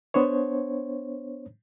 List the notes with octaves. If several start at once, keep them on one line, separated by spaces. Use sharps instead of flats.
B3 D4 C5 C#5